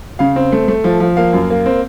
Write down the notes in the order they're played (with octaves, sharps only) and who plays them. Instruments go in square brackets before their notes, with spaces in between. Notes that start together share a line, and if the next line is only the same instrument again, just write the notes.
[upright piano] C#3 F5
C4
A3
A3
F3
F3
A#3 F5
F#2
A#3
C4